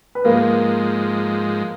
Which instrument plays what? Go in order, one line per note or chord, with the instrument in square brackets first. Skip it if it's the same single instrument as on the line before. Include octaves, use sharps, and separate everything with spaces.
[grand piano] B4
[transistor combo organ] G#2 F3 G#3 [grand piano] A#3 A#4